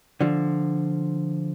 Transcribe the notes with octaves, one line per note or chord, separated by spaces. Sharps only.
D3 F3